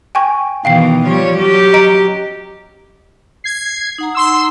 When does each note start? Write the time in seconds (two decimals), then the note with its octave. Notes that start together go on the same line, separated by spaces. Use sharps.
0.15 G5 G#5 C#6
0.65 B2 D#3 E3 F5 G5 C7
1.05 F3 G3 C#5
1.37 F#3 C#4 G4
1.73 D#5 A#5 D7
3.44 G#6 C7
3.98 D#4 F#5 A#5
4.15 C6 E6